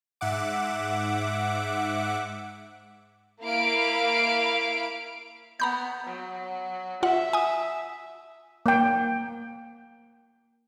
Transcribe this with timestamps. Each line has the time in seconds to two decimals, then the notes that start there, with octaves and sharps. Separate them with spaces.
0.21 G#2 E5 F#5 D6
3.43 A#3 E4 F5 B5 D7
5.60 B3 A#5 B5 G6
6.06 F#3
7.03 F4 E5 F#5
7.33 G#5 D#6
8.66 A#3 G5